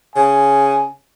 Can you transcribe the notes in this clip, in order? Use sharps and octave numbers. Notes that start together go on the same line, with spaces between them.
C#3 G#5